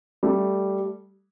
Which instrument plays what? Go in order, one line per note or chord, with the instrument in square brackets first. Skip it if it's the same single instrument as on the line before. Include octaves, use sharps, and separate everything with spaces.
[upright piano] G3 A3